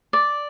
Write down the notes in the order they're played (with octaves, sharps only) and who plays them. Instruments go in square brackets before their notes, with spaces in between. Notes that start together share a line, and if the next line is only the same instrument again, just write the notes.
[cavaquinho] D5